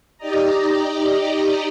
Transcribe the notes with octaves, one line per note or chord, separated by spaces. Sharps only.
D#4 G4 D5 D#5 A#5